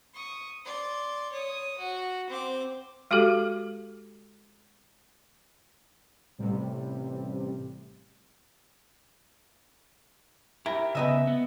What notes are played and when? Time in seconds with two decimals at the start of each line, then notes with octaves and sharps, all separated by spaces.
0.14 C#6 D#6
0.65 D5 C6
1.32 C#5 D#6
1.78 F#4
2.29 C4 D6
3.11 G#3 F#4 G4 A4
6.38 A1 C3 G3
10.66 E4 G4 A#4
10.95 C#3 B3 B4 D#5 E5
11.27 B3